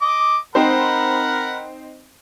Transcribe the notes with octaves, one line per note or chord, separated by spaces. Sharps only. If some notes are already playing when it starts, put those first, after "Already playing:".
D#5 D6
C4 D#4 A#4 C5 F#5 B5